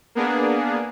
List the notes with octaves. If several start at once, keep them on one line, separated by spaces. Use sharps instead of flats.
A#3 B3 D4 G#4